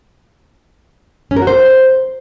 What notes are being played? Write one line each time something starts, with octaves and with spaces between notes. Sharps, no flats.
C#4
A#4
F#4
C5